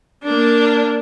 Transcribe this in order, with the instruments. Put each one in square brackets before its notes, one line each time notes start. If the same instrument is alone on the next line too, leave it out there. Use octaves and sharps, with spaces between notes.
[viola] A#3 D4